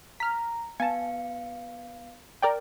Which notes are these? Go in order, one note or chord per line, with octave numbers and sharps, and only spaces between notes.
A#5 F6 B6
B3 F5 G#5 A5 C#7
A#4 D5 G5